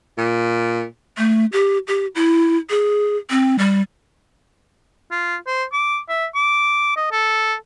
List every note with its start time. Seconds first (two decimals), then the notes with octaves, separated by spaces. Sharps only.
0.18 A#2
1.18 A3
1.52 G4
1.88 G4
2.15 E4
2.70 G#4
3.30 C4
3.59 G3
5.11 F4
5.46 C5
5.72 D6
6.09 E5
6.35 D6
6.96 D#5
7.11 A4